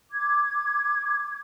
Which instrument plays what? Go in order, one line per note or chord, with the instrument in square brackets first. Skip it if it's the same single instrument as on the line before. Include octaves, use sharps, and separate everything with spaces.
[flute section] D6 G#6